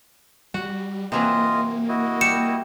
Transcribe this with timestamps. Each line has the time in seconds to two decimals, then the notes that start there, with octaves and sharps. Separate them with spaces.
0.54 G3 F#4
1.12 C3 E3 F#3 A#3 F4 D#5
1.89 E4 F#4 D#5
2.21 G3 C#7 E7